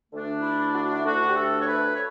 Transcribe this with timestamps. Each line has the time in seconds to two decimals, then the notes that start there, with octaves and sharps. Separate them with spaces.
0.12 D2 D3 A3 D4
0.42 E4
0.73 F#4
0.93 E4
1.05 D2 D3 A3 D4 F#4
1.28 G4
1.36 A4
1.60 C#5
1.67 B4
1.94 C#5